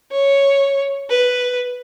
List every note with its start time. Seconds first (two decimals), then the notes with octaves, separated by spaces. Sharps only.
0.11 C#5
1.10 B4